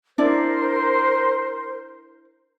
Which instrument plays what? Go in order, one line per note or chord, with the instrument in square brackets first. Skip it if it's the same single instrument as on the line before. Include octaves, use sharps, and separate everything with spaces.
[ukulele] D4 E4 D5 [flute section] A#4 C5